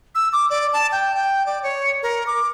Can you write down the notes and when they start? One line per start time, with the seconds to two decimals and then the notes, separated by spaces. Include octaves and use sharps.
0.15 E6
0.33 D6
0.50 D5
0.73 A5
0.92 G5
1.15 G5
1.46 D5
1.63 C#5
2.03 A#4
2.27 D6